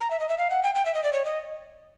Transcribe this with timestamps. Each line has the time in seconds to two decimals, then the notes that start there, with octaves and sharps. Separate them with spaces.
0.01 A#5
0.11 E5
0.20 D#5
0.29 E5
0.38 F5
0.50 F#5
0.63 G5
0.75 G5
0.85 E5
0.95 D#5
1.04 D5
1.13 C#5
1.25 D#5